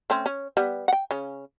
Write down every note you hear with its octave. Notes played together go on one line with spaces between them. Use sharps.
A3 C4 C#4
C#4
G3 B3
F#5 G5
C#3 C#4